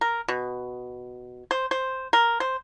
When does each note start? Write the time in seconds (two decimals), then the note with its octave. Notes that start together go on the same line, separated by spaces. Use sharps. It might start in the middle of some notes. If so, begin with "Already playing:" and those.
0.01 A#4
0.28 B2
1.51 C5
1.71 C5
2.13 A#4
2.40 C5